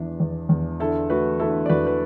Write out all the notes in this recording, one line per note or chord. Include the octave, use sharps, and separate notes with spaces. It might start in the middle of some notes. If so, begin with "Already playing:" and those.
Already playing: E2 E3 B3 D4
E2
E2
D3 E4 A4
A3 F#4 B4
D3 E4 A4
D5
E2 F#4 B4
B4